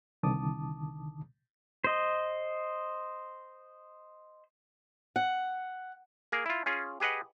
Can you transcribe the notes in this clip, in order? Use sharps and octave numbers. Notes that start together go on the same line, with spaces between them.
C2 D3 D#3 A5 D6 D#6
C5 D#5
F#5
A#3 G#4 A#4
E4 F4
C#4 F4 G#4
G4 G#4 B4 D#5 F#5